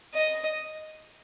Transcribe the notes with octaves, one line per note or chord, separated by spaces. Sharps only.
D#5